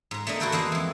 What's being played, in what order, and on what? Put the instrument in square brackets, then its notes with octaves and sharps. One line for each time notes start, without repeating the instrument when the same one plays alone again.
[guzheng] G#2 A#5
A3 A#3 D4 D#5
A#3 F#4 G#4 A4 B4 G5
E2 G#3 D#4 F#4 F5
F2 E3